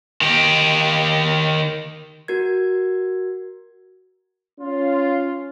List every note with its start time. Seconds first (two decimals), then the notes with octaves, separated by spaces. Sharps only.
0.22 D#3 G4
2.28 F#4 A#4 G#6
4.60 C#4 F4